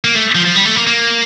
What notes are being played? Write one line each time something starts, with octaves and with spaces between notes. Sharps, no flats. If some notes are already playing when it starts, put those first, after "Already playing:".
A#3
A3
F3
F3
G3
A3
A#3
A#3